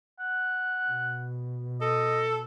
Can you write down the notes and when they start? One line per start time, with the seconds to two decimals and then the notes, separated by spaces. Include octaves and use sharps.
0.20 F#5
0.87 B2
1.81 A4 D#5